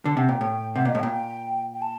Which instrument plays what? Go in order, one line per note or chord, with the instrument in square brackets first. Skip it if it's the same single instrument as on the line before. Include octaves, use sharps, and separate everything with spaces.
[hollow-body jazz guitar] D3 [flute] A5
[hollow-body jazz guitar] C3 [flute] F#5
[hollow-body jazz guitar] A#2 [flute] G5
[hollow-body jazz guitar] A2 [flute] G5
[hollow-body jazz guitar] C3 [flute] F#5
[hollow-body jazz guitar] A#2 [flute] D#5
[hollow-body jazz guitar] A2
[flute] G5
[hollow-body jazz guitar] A#2
[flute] G5
G5
A5